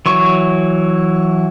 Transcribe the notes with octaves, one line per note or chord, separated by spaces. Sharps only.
E3 F#3 C#6